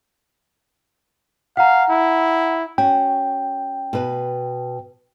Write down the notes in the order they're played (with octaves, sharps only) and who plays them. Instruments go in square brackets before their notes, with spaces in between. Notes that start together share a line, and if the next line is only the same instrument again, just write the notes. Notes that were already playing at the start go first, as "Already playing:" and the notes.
[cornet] F5 [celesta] F#5 A#5
[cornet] E4
[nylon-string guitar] C#4 F#4 [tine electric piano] G5
[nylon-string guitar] B2 B4